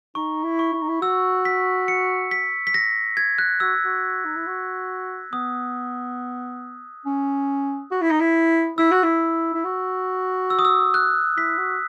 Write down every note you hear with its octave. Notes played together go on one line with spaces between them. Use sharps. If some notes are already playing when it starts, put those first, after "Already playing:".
D#4 C#6
E4
C#6
E4
D#4
E4
F#4 E6
B6
C#7
B6
B6
A#6
G#6
F#6
F#4 E6
F#4
D#4
E4
F#4
B3 D#6
C#4
F#4
E4
D#4
E4
E4 E6
F#4
E4
E4
F#4
E6
D#6
E6
F#6
E4 B6
F#4